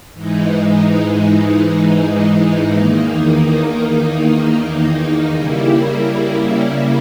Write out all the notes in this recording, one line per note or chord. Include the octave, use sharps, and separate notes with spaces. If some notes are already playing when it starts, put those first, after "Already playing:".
G#2 E3 G#3 D#4
E2 D#3 A#3 D#4
C#3 G3 A#3 E4